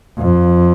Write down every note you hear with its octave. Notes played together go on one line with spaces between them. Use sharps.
F2